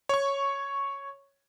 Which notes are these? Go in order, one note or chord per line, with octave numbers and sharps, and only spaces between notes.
C#5 C#6